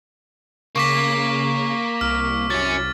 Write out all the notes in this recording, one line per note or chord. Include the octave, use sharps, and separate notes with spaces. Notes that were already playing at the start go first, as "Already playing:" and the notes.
C#3 A#3 C#6 D6 B6
C2 F6
F#3 C#4 A6